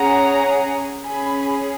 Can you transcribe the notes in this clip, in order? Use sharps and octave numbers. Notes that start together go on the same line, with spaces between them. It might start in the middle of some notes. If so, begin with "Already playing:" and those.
Already playing: C#4 G#4 F#5 A#5
C#4 G#4 G#5 B5